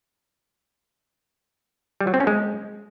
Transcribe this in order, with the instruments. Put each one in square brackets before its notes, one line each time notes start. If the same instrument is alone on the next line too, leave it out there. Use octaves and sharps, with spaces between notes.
[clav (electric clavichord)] G3
F#3
C4
C#4
G#3